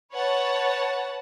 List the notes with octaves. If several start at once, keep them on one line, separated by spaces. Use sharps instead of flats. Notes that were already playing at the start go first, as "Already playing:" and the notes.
B4 C#5 F#5 A5